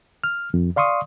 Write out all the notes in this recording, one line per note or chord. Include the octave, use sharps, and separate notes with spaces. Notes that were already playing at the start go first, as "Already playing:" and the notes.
F6
F2
D5 F5 C6 C#6 D#6